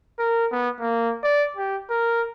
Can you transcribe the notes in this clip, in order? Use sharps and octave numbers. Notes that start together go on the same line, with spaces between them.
A#4
B3
A#3
D5
G4
A#4